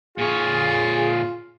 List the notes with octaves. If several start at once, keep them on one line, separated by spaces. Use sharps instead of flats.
A#2 F4 G#4 C#5